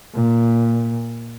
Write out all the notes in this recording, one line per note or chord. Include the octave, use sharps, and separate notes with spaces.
A#2